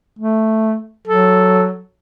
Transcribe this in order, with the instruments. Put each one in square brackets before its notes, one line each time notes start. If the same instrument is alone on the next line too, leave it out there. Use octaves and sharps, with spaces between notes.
[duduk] A3
[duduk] F#3 [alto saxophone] A4